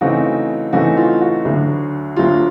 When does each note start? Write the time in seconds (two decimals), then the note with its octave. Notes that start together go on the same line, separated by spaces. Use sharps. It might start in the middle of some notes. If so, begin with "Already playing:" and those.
0.01 C#3 E3 A3 C4 D#4 F#4
0.73 C#3 E3 A3 C4 D#4 F#4
0.97 F4
1.21 F#4
1.45 D2 D3 F#3
2.16 D2 D3 F#3 F4